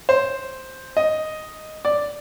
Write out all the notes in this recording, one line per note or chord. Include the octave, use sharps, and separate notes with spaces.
C5
D#5
D5